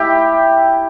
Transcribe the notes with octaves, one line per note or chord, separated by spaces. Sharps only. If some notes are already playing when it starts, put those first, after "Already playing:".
Already playing: E4 G4